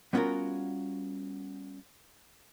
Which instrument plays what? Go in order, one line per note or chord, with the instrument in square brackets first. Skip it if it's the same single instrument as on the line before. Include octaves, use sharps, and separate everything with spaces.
[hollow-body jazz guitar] G3 B3 C#4 F4 F#4 A#4